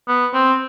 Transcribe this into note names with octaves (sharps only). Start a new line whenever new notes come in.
B3
C4